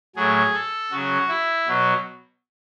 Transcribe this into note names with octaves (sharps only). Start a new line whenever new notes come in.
A2 F#3 G#4
A4
C#3 F#3 F#4
E4
B2 F#3